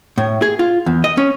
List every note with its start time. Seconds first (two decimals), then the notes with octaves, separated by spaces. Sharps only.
0.18 A2
0.42 G#4
0.59 F4
0.86 E2
1.04 D#5
1.17 C#4